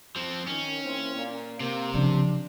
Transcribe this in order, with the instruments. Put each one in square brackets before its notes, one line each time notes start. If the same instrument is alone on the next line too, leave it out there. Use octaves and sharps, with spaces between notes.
[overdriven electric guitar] F3 C4
[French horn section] D#3 [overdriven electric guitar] C#4
[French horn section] E3 A#3 C4
A#2
[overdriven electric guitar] C3 [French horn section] A#3
[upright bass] C#3 F3 [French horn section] D4